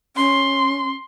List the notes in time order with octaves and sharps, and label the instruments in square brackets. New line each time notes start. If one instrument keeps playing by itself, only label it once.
[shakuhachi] C#4 [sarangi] C6